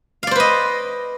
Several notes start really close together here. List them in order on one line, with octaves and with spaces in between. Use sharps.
F5 D5 C5 B4 D#5